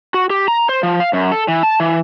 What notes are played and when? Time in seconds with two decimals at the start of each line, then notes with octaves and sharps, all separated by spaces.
0.14 F#4
0.30 G4
0.48 A#5
0.69 C5
0.83 F3
1.00 F5
1.13 F#2
1.32 A4
1.48 E3
1.63 A5
1.80 E3